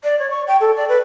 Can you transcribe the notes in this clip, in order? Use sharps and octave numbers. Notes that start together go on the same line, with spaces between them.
D5
C#5
C#6
G5
A4
D5
B4